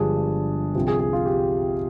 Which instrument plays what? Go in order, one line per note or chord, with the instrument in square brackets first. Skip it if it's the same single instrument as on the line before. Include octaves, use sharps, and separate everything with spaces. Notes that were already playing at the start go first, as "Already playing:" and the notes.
Already playing: [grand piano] G1 G2 F3 G#3 D4 G#4
C2 C3 F3
G#4
G#4
F4
G4